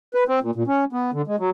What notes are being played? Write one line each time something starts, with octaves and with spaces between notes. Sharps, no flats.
B4
C4
A#2
A#2
C#4
B3
D3
G#3
F#3